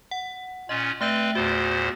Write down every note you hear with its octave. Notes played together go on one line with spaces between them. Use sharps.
F#5
A#2 C#4 F4 D#5
A3 C4 B4 E5 G6
E2 A#2 F#4 C5